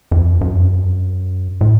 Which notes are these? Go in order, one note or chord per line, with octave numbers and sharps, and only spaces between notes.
F2
F#2
A2